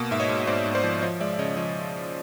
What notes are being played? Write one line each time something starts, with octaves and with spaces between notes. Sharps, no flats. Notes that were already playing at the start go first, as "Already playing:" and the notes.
Already playing: B2 A#3
G#2 E5
C#5 D#5
G#2
G#2 C5 D5
G#2
C5 D5
F3
F3 C#5 D#5
G#3 D5 E5
E5
C#3 C#5 D#5
F3 C#5 D#5